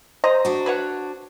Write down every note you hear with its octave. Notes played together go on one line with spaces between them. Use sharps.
C5 D#5 A#5
D4 F#4
B4 C#5 F#5